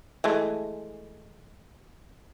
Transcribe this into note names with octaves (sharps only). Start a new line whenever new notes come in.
E3 G#3 A3